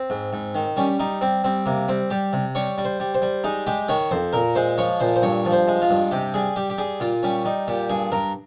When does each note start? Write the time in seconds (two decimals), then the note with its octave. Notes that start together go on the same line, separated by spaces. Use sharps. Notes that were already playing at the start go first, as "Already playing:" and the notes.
Already playing: C4
0.10 G#2
0.33 G#2
0.55 D#3
0.76 G3 C#4
0.99 G3 D#4
1.21 G3 C4
1.44 G3 C4
1.66 C3 A#3
1.88 G3 C4
2.10 G3 G4
2.33 C3
2.55 G3 C#5
2.78 G3
2.85 C5
3.00 G3
3.14 C5
3.22 G3
3.44 G#3 D#4
3.67 G#3 G4
3.88 D#3 C#5
4.11 F2 C5
4.33 A#2 A#4
4.55 G#3 C5
4.78 F3 C#5
5.00 A#2 C5
5.16 C5
5.22 G2 C#5
5.45 F3
5.52 C5
5.67 G#3
5.82 F4
5.90 G2
6.11 C3 G4
6.34 G3 G#4
6.56 G3 G4
6.70 G4
6.78 G3 G#4
7.00 A#2 F4
7.23 G3 C#4
7.45 G3 D#4
7.68 A#2 G4
7.89 G2 G#4
8.12 G2 A#4